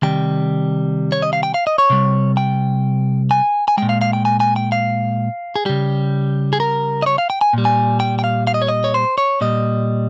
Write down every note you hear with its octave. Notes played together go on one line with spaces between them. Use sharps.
C3 D#3 G3 G5
C#5
D#5
F5
G5
F5
D#5
C#5
C3 G3
G5
G#5
G#5
A#2 G#3 G5
F5
F5
G5
G#5
G#5
G5
F5
G#4
C#3 G3 G4
G#4
A#4
D#5
C#5
F5
G5
G#5
A#2 G3
G#5
G5
G5
F5
F5
D#5
C#5
D#5
C#5
C5
C#5
A#2 G3 D#5